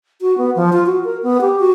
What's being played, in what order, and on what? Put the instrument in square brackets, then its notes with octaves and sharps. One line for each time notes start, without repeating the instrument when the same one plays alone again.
[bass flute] F#4
B3
F3
F4
F#4
A#4
B3
G4
F#4